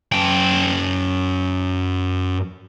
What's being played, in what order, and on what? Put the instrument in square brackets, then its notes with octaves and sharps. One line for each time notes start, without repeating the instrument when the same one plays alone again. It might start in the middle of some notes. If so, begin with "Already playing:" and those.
[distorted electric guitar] F#2 G5